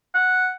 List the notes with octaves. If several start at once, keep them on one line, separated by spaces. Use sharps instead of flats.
F#5